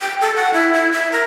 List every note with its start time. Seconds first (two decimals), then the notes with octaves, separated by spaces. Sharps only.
0.01 G5
0.21 A4
0.36 F#5
0.54 E4
0.73 E4
0.92 E5
1.12 A#4